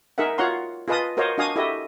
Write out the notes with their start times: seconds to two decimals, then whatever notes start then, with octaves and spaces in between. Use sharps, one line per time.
0.18 D#4 G#4 A#4 E5 F#5
0.38 F4 F#4 C#5 F#5 A#5 C6
0.88 F4 G#4 B4 D#5 A5 D#6
1.17 F#4 A#4 C5 C#5 D#5 F5
1.38 D4 F#4 D#5 F5 G#5 D#6
1.56 E4 F#4 G4 A4 D#5 E5